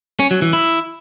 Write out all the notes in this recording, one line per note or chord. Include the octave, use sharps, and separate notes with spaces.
C#4
F#3
E3
E4